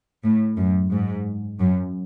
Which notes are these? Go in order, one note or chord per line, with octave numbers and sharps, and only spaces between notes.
A2
F#2
G#2
F#2